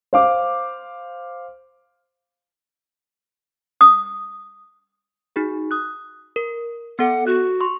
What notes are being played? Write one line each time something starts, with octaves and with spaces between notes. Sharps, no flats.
C5 F5 D6
D#6
D#4 F#4 G#4
D#6 F#6
A#4
B3 A4 F#5
F#4 F#6
C6 C#6